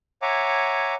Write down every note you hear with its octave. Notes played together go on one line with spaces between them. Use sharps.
C#5 E5 F#5 G#5 A#5 D6